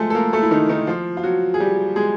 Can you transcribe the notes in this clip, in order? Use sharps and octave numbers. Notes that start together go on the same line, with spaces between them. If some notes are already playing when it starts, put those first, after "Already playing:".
Already playing: F3 G#3 A3 F4 G#4 A4
A4
A#3 A#4
A3 A4
E4
D#3 D#4
D#3 D#4
F3 F4
F4
F#3 F#4
G#4
G3 G4
G#3 G#4